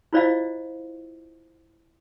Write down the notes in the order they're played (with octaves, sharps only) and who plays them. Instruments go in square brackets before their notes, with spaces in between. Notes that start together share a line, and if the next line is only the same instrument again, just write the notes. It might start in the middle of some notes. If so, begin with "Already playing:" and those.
[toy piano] E4 F4 C5 D5 D#5 F5